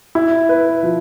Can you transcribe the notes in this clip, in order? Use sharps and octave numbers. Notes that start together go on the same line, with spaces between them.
E4
B4
F3